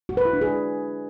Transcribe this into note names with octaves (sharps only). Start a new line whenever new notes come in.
F#4
B4
E4
D4
G#4